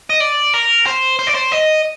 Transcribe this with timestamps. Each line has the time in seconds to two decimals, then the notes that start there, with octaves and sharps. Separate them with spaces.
0.10 D#5
0.20 D5
0.54 A#4
0.86 C5
1.19 C5
1.27 D5
1.35 C5
1.52 D#5